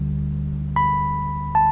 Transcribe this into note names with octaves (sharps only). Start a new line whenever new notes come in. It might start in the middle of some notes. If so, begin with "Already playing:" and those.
Already playing: D2 D3 G3
B5
A5